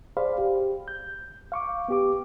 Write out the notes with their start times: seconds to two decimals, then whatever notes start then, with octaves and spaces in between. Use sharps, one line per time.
0.17 G#4 C5 D5 F5 B5
0.38 G4
0.88 G6
1.52 F5 C#6 D6
1.88 B3 G4 D6